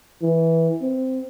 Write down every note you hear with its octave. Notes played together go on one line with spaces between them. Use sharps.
E3
C4